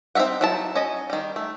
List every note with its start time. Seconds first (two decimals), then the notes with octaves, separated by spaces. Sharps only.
0.15 C4 D#4 A#4 E5 F#5
0.41 F#3 E4 A5
0.75 C#4 D#5
1.10 D#3 G3
1.36 A3